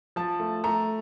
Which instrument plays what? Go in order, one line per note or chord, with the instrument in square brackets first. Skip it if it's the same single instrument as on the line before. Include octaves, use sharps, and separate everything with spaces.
[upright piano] F3 A5
A3
A3 A#5